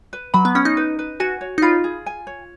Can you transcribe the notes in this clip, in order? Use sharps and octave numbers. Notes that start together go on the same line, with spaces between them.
B4
F#3 B5
B3
C#4 F#5
D#4
B4
B4
F#4 G#5
C#5
D#4
F4 B5
G#4
G#5
C#5